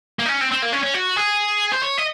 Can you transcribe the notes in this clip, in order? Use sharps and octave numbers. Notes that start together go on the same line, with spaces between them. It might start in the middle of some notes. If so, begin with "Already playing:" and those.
A#3
D#4
C#4
C4
C4
A#3
C#4
C#4
F#4
G#4
C5
C#5
D#5